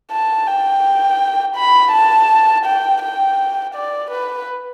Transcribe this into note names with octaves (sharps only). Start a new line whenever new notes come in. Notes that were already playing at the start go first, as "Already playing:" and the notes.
A5
G5
B5
A5
G5
G5
D5
B4